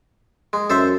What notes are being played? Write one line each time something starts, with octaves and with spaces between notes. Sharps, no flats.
G#3
F#2 A4 C5 E5